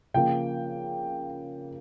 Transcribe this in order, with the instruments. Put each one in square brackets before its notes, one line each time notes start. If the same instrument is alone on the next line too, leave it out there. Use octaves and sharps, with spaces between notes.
[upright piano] C#3 F3 A#3 G5